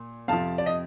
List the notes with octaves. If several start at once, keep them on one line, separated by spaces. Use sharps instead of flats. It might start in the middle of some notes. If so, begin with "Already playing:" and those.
Already playing: A#2
F2 C3 F3 F5 A5
D5
D#5